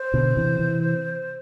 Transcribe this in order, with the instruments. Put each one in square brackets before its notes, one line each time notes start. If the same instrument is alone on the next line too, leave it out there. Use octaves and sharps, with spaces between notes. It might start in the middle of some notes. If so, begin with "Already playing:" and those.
Already playing: [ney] C5
[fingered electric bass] B2 D3
C3 E3
C3 E3